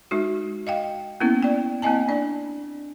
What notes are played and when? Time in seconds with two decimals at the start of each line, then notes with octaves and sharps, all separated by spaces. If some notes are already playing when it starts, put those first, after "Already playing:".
0.11 G#3 D#4 F#4
0.67 D#5 F5 G5
1.20 A#3 B3 C#4 E4
1.43 D5 G5
1.82 A#3 C4 E4 D#5 G#5 A5
2.08 D4 D5